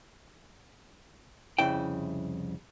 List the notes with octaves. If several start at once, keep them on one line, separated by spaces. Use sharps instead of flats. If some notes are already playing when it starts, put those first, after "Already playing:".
C2 F2 C#3 E4 G5